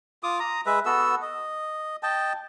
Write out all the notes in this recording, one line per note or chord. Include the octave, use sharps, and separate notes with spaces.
F4 D6 D#6
A#5 D#6
G#3 B4 E5
B3 F#4 A4 E6
D#5
D#5 G5 A5